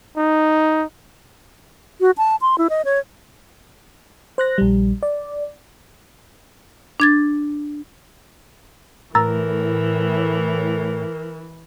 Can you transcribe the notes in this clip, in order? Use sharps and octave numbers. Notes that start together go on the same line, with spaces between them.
D#4
F#4
A5
C6
E4
D#5
C#5
C5 F#6 A#6
A#1 G3
D5
D4 G#6 A6
A2 E3 A#4 A#5 E6 A6